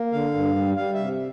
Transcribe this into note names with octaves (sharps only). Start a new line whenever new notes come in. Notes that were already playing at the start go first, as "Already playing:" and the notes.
Already playing: A#3
D3 F5
G2
G3
G3 F5
E5
C3